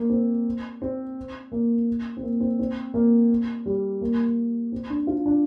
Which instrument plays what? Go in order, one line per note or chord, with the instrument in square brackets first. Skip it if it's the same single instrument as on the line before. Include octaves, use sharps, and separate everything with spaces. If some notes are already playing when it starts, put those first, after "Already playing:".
Already playing: [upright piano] A#3
C4
C4
A#3
C4
A#3
C4
C4
A#3
G3
A#3
C4
D4
F4
D4